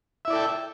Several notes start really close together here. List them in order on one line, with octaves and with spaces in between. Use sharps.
E5 E4 D5 A4 G5